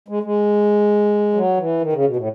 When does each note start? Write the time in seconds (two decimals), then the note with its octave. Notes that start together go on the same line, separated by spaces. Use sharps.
0.08 G#3
0.23 G#3
1.34 F#3
1.57 E3
1.82 D#3
1.93 C#3
2.05 B2
2.16 A2